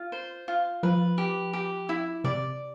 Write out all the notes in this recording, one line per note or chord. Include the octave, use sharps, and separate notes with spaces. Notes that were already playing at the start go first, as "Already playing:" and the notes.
Already playing: F4
C5
F4
F3 B4
G4
G4
E4
C3 D5